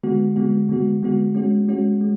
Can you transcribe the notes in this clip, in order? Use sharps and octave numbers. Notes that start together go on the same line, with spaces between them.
D3 G#3 B3 F#4
D3 G#3 B3 F#4
D3 G#3 B3 F#4
D3 G#3 B3 F#4
G#3 C#4 F#4
G#3 C#4 F#4
G#3